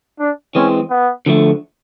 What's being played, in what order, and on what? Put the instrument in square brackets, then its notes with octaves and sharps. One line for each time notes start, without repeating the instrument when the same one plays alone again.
[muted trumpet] D4
[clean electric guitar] E3 G#3 C4 [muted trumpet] C#4
[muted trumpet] B3
[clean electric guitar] D3 F3 A3